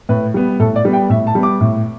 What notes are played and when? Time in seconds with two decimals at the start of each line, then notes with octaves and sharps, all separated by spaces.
0.09 A2 B4
0.34 G3 B3
0.60 A2 A4
0.76 D5
0.85 G3 B3
0.93 G5
1.10 A2 E5
1.27 A5
1.35 G3 B3
1.43 D6
1.61 A2